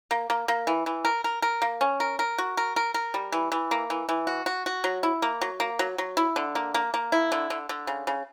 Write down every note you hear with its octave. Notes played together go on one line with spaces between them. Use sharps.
A#3
A#3
A#3
E3
E3
A#4
A#4
A#4
A#3
C#4
A#4
A#4
F#4
A#4
A#4
A#4
G3
E3
E3
A#3
E3
E3
F#4
F#4
F#4
F#3
E4
A#3
F#3
A#3
F#3
F#3
E4
D3
A#3
A#3
A#3
E4
D3
D3
D3
C#3
C#3